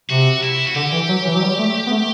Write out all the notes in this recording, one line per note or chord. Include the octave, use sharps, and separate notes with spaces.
C3 F#4
E4
F#4
D3 G4
E3
F#3
E3
F#3
G3
A3
B3
A3